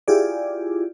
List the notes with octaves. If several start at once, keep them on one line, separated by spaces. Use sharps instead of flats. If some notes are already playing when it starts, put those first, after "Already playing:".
E4 F4 G4 G#4 D5